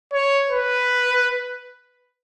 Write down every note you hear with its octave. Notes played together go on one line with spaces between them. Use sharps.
C#5
B4